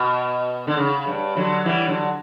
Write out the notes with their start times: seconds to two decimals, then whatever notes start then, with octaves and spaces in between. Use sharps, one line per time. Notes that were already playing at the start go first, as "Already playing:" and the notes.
Already playing: B2
0.67 D3
0.77 C#3
1.07 G2
1.36 D3 F#3
1.66 E3 G3
1.88 D3 F#3